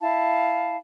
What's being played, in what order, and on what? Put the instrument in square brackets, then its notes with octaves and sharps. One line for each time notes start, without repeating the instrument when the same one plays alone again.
[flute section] E4 F5 A5